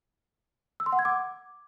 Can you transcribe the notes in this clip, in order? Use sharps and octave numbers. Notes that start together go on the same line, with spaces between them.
E6
C6
F#5
G#6
D6